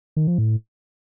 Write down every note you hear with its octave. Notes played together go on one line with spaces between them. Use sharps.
D#3
F3
A2